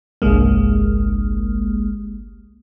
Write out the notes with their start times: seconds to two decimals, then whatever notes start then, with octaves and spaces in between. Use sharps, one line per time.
0.22 G1 C2 G#3 A#3